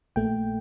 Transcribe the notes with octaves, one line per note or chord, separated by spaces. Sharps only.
A#1 A#2 A3 G5